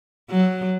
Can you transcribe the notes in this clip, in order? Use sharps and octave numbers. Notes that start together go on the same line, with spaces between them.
F#3